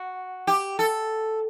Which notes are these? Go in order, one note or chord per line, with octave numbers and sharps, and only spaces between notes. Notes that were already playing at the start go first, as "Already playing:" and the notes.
Already playing: F#4
G4
A4